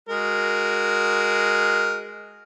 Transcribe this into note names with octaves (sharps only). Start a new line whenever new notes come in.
G#3 F#4 A#4